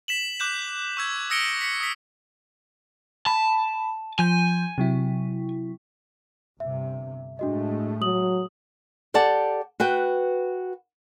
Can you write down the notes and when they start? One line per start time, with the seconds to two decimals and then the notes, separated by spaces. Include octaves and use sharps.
0.08 B6 E7 F#7
0.40 D6 F#6 G6 E7
0.97 C#6 E6 G#6
1.30 D#6 E6 A#6 C#7 D7 G7
1.61 B6 C#7
1.80 D#6 B6
3.26 A5 B5
4.19 F3 G#5 G6
4.78 C3 F#3 E4
6.60 G1 C3 E5
7.39 A2 G#3 A3 D4 F#4 D#5
8.01 F#3 D#6 F#7
9.14 G4 A4 D5 F#5 A5
9.80 F#4 B4 G5